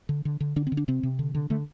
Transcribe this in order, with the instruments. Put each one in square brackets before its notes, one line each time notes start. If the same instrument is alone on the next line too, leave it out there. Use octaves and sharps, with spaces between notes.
[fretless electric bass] D3
D3
D3
D3 D4
C4
D3
D4
C3 C4
C3
D3
D3
D3 A3